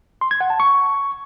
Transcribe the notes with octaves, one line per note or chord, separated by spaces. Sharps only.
C6
G#6
F#5
A5
C#6